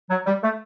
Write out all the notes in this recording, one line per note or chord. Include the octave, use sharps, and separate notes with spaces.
F#3
G3
A3